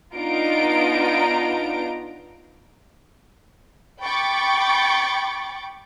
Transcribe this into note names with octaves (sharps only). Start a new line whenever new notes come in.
B3 D4 D#4 F4 A#5 D7
G5 B5 C#6 D6 A6